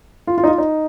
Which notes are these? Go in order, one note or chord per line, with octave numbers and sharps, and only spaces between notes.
F4
F4
D#4
F4
D#4